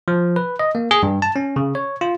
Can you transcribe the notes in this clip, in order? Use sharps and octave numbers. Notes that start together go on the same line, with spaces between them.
F3
B4
D#5
A#3
G#4
G2
A5
C#4
C#3
C#5
F4